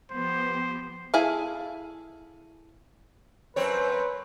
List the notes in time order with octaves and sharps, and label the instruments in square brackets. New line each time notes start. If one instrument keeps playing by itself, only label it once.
[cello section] F3 B3 G4 [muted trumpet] C5
[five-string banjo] E4 G#4 A4 F5
[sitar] F#2 C4 C#5 [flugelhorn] B4